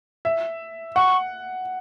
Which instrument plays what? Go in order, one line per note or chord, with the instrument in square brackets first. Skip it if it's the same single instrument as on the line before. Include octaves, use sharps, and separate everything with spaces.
[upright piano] E5
[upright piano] F#5 [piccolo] C#6